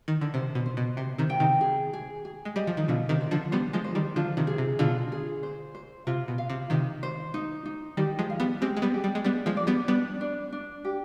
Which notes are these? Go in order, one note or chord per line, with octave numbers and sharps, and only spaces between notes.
D#3
D3
C3 C5
B2
C5
B2
C3 C5
C3 D#3
G5
C3 D#3
G#4
G#4
G#4
G#3
G3 D#5
F3
D#3
B2 D3 F4
C3 D#3
C5
D3 F3
G3 B3 C5
F3 G#3
C5
D#3 G3
D3 F3 F4
C3 D#3
G#4
C3
B2 D3 F4
G#4
C5
C5
C3 F4
B2
F5
C3
C3 D#3 D#4
C5
D#4
D#4
D#3 G3 G4
F3 G#3
F5
G3 B3
G#3 C4 G4
G#3
G3 B3
G4
G3
G#3
G3 B3 D4
F3 G#3
D5
G3 B3
G3 B3 D4
D4
D4
G4